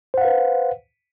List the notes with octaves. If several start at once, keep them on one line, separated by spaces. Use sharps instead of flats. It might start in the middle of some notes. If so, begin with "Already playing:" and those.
B4 C5 F5 F#5